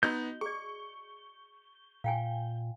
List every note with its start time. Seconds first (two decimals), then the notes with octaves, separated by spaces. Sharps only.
0.03 B3 D#4 F#4 D#5 G6
0.41 G#4 D5 C#6
2.04 A#2 F5 G5 G#5